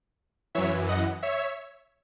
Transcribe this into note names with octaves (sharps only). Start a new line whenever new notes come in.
F#2 E3 C#5 E5
D#5 F#5
C#5 E5